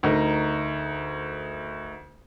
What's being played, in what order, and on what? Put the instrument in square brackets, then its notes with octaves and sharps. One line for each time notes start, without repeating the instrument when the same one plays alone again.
[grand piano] D2 D#4 A#4